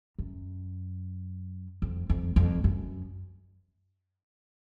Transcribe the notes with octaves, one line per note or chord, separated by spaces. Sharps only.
F#2
F2
F2
F2
F#2